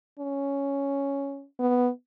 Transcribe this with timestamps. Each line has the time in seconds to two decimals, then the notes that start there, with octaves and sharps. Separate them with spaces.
0.19 C#4
1.59 B3